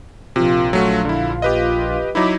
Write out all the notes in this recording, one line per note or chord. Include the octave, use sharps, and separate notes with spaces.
A#1 C3 F4
F#3 A3 F#4
D3 E4
G4 B4 D#5
F#3 D#4 E4 B5 D6